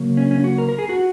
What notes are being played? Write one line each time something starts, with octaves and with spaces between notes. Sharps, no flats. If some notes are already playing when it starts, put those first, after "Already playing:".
Already playing: C#3 F#3 A#3
C#4
C#4
F#4
A#4
A#4
G#4
F#4